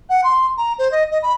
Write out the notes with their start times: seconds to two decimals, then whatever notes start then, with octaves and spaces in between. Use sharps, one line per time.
0.09 F#5
0.24 C6
0.57 A#5
0.78 C5
0.91 D#5
1.11 D#5
1.22 B5